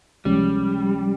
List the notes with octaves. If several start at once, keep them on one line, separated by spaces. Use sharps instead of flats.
C#2 C3 F3 G3 G#3 C#4